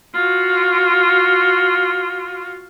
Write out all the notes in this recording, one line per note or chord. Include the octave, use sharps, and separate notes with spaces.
F4 F#4